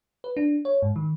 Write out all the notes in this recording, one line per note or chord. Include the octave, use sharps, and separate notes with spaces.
B4
D4
C#5
G#2
D#3